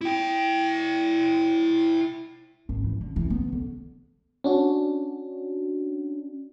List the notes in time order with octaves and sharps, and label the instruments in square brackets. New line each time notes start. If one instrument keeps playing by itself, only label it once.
[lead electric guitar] E4 G5
[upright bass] G#1
E3
D3
E3
B3
D3
[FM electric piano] C#4 D4 F#4